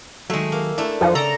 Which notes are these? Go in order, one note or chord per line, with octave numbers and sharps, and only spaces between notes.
D#3 F#3 G#3 A3
A#3
A3 D4 E4
F2 F3 D#4 F#5
C#3 A4 D5 A#5